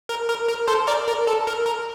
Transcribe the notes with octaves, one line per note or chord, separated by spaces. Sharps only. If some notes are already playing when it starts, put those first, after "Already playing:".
A#4
A#4
A#4
A4 C5
A#4 D5
A#4
A4
A#4
A#4